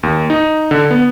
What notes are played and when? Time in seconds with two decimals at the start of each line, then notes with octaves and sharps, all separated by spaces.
0.03 D#2
0.30 D#4
0.71 D3
0.91 B3